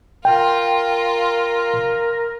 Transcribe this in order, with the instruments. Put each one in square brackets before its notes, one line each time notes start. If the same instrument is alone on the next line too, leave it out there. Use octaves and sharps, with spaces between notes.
[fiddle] F4 [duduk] A#4 [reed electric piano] G5